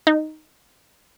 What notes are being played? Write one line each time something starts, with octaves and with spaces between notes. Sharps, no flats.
D#4